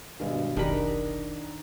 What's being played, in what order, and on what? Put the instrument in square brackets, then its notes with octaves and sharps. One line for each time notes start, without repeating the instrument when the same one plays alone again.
[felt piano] B1 G2 [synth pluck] D#3 G#3
[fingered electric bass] F1 B1 [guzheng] D#3 B5 [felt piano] D4 A#5 [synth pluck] G4 G#4